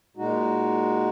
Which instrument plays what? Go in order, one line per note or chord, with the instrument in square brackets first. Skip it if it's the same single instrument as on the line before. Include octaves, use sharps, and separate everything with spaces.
[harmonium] A#2 G#3 D#4 F#4